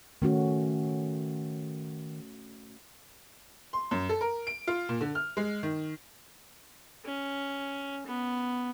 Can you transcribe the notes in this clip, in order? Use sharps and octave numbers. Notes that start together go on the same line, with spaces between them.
D#3 A3 C#4 F#4
C6
F#2
A4
A#4
D7
F4
A#2
D3
F6
G#3
D#3
C#4
B3